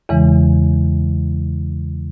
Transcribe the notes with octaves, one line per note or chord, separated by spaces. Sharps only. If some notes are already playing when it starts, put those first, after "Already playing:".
E2 C#3 E3 G#3